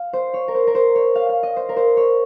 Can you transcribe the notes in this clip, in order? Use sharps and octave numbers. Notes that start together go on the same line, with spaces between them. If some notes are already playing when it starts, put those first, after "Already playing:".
Already playing: F5
C5
C#5
A#4
C5
A#4
C5
C#5
F5
F5
D#5
C5
A#4
C5
C#5